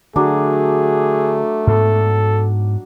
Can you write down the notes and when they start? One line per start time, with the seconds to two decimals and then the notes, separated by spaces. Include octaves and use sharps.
0.16 D3 F#3 A3 D4 G#4
1.67 G#2 B3 A4